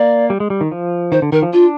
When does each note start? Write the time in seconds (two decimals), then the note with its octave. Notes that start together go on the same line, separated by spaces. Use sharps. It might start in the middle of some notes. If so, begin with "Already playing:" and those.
Already playing: A#3 D5
0.30 G3
0.40 G#3
0.50 G3
0.61 D#3
0.71 F3
1.12 D#3 C5
1.22 D3
1.32 D#3 A#4
1.42 F3
1.53 D4 F4